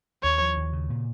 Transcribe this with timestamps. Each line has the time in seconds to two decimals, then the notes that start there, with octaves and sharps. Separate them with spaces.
0.23 D#2 C#5
0.40 F3
0.57 D#2
0.73 C#3
0.90 A#2